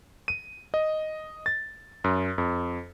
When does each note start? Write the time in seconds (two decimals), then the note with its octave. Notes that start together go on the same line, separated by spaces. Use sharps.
0.28 D#7
0.74 D#5
1.46 A6
2.04 F#2
2.38 F2